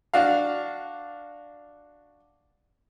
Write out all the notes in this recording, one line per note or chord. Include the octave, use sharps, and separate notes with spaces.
D4 F#4 F5